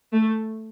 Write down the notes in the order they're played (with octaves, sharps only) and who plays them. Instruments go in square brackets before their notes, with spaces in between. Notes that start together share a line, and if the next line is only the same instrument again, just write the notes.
[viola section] A3